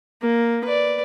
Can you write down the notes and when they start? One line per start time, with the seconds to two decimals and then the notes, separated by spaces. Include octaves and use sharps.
0.22 A#3
0.65 B4 D5